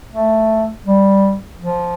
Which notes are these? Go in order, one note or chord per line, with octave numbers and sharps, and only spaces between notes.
A3
G3
F3